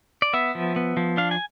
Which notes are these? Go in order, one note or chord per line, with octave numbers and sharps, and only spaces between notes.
D5
B3 E5
F3
B3
F3
D4 F5
G#5